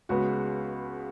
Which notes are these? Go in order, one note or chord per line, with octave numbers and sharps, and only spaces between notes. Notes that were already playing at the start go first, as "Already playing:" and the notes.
C#2 C#3 G#3 B3 F#4